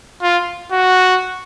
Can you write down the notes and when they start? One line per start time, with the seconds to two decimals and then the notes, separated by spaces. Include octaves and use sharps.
0.22 F4
0.72 F#4